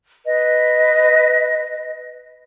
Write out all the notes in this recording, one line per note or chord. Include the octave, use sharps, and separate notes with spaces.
B4 D#5